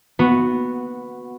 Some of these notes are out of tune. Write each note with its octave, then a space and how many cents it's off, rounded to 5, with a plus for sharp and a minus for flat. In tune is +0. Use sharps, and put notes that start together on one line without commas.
B3 +0 F#4 -10